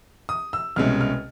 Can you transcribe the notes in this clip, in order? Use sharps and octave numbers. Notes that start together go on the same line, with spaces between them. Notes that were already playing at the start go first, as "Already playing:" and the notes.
D#6
E6
C2 B2 G#3 C#4 F6
F6